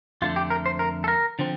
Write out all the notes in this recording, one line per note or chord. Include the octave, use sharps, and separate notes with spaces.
F2 D3 A3 F4
G4
A#4
C5
A#4
A4
A#4
D3 F3 C4